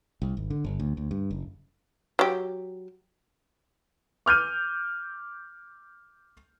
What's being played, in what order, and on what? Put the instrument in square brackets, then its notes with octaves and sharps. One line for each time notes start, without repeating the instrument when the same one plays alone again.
[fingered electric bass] C2
G#1
D3
G1
D2
D2
G2
F#1
[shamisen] F#3 G4
[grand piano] D6 F6 G6 D#7